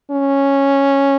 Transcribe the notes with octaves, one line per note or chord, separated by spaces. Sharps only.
C#4